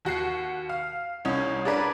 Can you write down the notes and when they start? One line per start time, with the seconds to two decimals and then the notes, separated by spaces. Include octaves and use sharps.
0.05 D#2 F#4 F#5 C7
0.69 F5
1.25 C2 C#4 D#4
1.65 D4 G#4 A#4 B4 D5